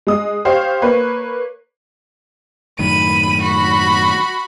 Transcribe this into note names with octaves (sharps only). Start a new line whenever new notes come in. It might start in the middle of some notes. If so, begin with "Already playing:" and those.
G#3 D#6
G4 C5 C#5 F5
A#3 B4 C#5
F#2 A2 D#3 B5 D#7
F#4 B5